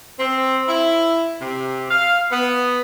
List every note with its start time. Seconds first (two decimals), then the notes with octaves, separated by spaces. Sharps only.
0.19 C4
0.68 E4
1.41 C3
1.90 F5
2.31 B3